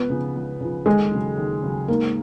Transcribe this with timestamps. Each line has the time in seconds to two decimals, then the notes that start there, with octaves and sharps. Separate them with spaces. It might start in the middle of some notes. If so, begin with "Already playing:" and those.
Already playing: C#2 B3
0.10 C#3 F3
0.36 C#2
0.61 C#3 F3
0.86 D#2 G#3
1.11 C#3 F#3
1.37 D#2
1.63 C#3 F#3
1.88 G#2 A#3